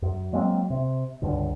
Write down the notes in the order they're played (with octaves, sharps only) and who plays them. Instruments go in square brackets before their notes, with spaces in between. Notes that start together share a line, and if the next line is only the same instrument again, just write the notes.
[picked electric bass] F#2
F#3 G#3 A#3 C4
C3
C#2 G2 D3